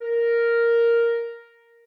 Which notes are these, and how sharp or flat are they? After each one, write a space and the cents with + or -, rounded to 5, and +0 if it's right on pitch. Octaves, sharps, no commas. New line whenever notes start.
A#4 +0